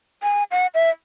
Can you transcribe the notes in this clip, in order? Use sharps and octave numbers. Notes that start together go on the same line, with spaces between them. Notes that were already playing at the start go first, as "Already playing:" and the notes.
G#5
F#5
E5